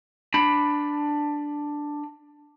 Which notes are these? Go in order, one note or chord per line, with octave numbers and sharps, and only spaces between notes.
D4 B5